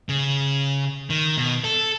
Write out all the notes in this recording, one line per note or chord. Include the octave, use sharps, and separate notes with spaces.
C#3
D#3
B2
A4